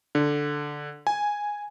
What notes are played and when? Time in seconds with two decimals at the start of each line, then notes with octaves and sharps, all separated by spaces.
0.15 D3
1.07 G#5